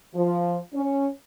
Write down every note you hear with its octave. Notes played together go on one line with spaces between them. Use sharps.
F3
C#4